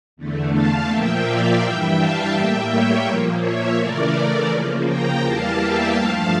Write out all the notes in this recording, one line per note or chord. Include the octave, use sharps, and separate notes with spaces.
E2 D3 A3
F5 A5
A#2 F3 A#3 E5 G5
D5 F5
G2 E3 G3 E5 G5
F5 A5
A2 G3 A#3 E5 G5
C#5 E5
A#2 F3 A#3
C#5 E5
C#3 E3 A3 A#4 D5
A#4 D5
C#3 F3 A#3
G5 A#5
E2 E3 G3 A#3 F5 A5
E5 G5
G2 F3 A3 F5 A5